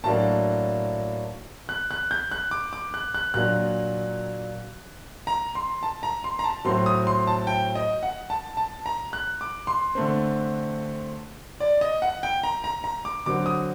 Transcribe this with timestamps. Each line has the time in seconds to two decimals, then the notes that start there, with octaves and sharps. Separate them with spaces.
0.04 A2 F#3 A#3 D4 A5
1.69 F#6
1.91 F#6
2.11 G6
2.31 F#6
2.51 D6
2.73 D6
2.94 F#6
3.15 F#6
3.34 A#2 F#3 A#3 D4 F#6
5.27 A#5
5.55 C6
5.83 A5
6.03 A#5
6.24 C6
6.39 A#5
6.44 A5
6.65 A2 F#3 C4 C6
6.86 D#6
7.07 C6
7.27 A5
7.47 G5
7.75 D#5
8.03 F#5
8.30 A5
8.57 A5
8.86 A#5
9.13 F#6
9.41 D6
9.67 C6
9.95 D3 A3 C4
11.60 D5
11.81 D#5
12.02 F#5
12.23 G5
12.43 A#5
12.64 A#5
12.84 A#5
13.05 D6
13.26 D3 F#3 C4 D6
13.46 D#6